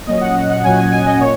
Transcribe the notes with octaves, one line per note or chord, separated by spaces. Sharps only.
A#2 F#3 C#4 D#5
F#5
F#5
A#2 F#3 C#4 G#5
G#5
G#5
D#5
A#2 C#5